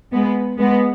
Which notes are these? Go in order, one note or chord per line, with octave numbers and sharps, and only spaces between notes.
G#3 B3
G#3 B3